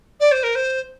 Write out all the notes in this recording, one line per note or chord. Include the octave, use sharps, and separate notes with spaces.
D5
C5
A#4
C5